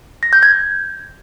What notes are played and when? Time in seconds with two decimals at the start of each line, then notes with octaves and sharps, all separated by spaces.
0.23 A#6
0.33 G6
0.43 G#6